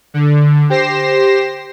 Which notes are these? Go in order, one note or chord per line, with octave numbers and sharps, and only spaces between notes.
D3
G4 C5 A#6 C7 E7